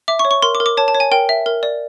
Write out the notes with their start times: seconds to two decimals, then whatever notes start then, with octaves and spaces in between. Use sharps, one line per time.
0.08 E5 D6
0.19 C#6
0.25 C#5
0.31 C#6
0.42 A#4 C6
0.55 D6
0.60 A#4
0.66 D6
0.77 C#5 A5
0.88 A5
0.95 C#5
1.00 G#5
1.11 A#4 G5
1.29 E5
1.46 A#4
1.63 D5